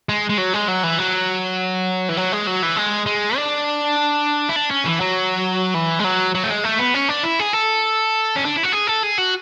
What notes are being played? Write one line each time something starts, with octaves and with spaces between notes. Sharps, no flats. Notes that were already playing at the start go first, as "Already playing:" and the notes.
G#3
G#3
F#3
G#3
F#3
E3
F#3
E3
F#3
G#3
F#3
E3
G#3
G#3
D4
E4
D4
C#4
E3
F#3
E3
G#3
F#3
F#3
A3
G#3
A3
B3
C#4
D4
E4
G#4
A4
C#4
D4
E4
F#4
G#4
A4
G#4
F#4